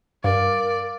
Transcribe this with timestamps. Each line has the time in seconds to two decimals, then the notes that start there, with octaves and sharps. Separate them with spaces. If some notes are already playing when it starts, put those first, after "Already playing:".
0.24 G2 A#4 D5 F5